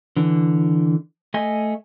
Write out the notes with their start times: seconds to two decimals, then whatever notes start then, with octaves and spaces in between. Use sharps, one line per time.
0.16 D3 E3
1.34 A3 D#5 G#5